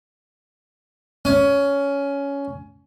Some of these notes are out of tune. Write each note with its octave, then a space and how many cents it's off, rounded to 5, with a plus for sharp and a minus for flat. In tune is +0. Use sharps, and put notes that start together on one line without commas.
C#4 +15